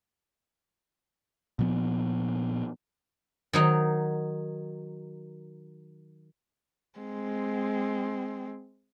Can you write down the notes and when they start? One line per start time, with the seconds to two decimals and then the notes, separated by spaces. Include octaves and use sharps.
1.59 A#2 F3 B3
3.53 D#3 F#3 D#4
6.99 G#3 C4